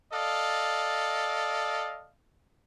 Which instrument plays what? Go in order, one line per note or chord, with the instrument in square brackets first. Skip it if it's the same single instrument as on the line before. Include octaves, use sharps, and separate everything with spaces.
[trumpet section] A4 D5 D#5 F5